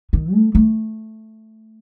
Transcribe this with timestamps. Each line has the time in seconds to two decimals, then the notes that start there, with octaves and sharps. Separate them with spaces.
0.13 D#3
0.33 A3
0.55 A3